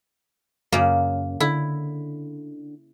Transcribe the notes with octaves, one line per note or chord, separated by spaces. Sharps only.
F#2 C#3 A#3
D3 E4